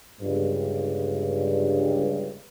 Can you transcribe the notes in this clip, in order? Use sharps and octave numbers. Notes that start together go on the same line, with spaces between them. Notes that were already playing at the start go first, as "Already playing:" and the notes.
G1 C#2 G2